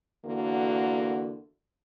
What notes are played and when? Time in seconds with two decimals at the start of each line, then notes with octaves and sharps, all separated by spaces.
0.24 E2 D3 A#3 F#4